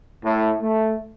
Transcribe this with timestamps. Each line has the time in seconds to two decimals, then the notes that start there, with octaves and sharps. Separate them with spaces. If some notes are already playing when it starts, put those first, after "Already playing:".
0.23 A2
0.61 A3